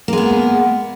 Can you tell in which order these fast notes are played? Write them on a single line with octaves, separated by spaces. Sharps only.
A#3 G#3 B3